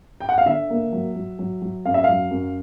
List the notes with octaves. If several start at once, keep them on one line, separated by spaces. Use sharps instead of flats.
G5
F#5
F5
D3 E5
A#3
F#3
F#3
F#3
F#3
F#2 F5
E5
F#3 F5
F#2